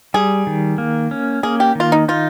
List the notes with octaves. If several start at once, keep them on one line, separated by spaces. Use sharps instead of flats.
G3 G#4
D#3
A#3
C#4
A#3 G#4
G4
D#3 F4
D#4
D#4 F4